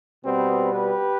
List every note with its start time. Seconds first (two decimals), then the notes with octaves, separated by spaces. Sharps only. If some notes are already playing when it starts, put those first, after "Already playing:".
0.24 B2 G3 B3 C4
0.72 G4 B4